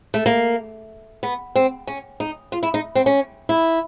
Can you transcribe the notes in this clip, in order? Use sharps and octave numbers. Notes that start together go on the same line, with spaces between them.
A3
A#3
B3
C4
C#4
D#4
F4
E4
D#4
C4
C#4
E4